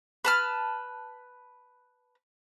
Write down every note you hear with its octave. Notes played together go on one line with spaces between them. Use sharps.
B4 A5 F6